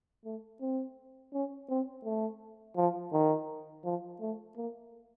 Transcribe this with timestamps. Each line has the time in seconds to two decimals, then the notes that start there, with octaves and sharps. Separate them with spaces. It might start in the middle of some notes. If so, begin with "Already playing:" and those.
0.25 A3
0.61 C4
1.33 C#4
1.69 C4
2.05 A3
2.77 F3
3.13 D#3
3.85 F3
4.21 A3
4.57 A#3